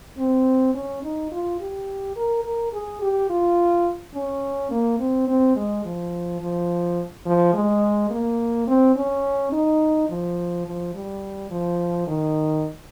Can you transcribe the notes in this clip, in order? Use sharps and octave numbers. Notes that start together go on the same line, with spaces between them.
C4
C#4
D#4
F4
G4
A#4
A#4
G#4
G4
F4
C#4
A#3
C4
C4
G#3
F3
F3
F3
G#3
A#3
C4
C#4
D#4
F3
F3
G3
F3
D#3